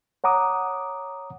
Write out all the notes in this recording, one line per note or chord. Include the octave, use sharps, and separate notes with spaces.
C#5 F#5 A#5 D6 D#6